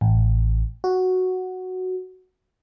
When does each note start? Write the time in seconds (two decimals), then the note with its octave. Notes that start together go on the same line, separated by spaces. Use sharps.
0.01 A1
0.84 F#4